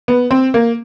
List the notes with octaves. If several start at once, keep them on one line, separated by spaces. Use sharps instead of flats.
B3
C4
A#3